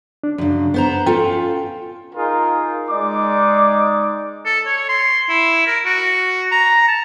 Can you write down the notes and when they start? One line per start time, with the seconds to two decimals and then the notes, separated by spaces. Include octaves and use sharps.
0.24 D4
0.38 F#2 C#3
0.74 B3 C5 A#5
1.06 C#4 F4 A4 G5
2.16 D#4 F4 G#4 A#4
2.90 G#3 D#4 D5 D6
4.46 A4
4.66 C#5
4.89 C6
5.29 E4
5.67 A#4
5.85 F#4
6.51 A#5
6.88 A5